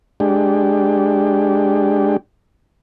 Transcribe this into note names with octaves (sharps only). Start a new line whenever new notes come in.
G#3 D4 G4